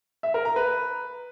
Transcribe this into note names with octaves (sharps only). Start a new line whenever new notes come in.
E5
A#4
A#5
B4